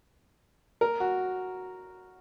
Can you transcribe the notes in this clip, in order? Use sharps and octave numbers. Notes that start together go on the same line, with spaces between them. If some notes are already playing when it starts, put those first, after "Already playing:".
A#4
F#4